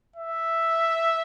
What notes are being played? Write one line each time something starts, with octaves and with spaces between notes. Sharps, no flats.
E5